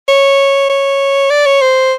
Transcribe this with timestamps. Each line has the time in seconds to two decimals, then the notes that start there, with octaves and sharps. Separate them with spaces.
0.08 C#5
0.70 C#5
1.30 D5
1.46 C#5
1.61 C5